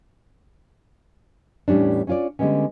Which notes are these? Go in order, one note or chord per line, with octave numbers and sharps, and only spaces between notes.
E2 A2 G3 C#4 D4
C#4 D4 F4 C#5 D5
D3 G3 G#3 B3 C#4